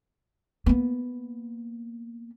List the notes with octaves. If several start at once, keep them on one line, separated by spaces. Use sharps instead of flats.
A#3 B3